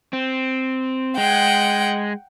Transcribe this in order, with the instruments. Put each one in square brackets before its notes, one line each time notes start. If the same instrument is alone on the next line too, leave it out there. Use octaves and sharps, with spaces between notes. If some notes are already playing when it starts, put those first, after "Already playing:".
[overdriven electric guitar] C4
[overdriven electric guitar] G#3 [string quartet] F#5 G5